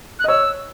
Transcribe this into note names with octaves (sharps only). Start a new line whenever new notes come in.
F#6
D#5
C#5 E6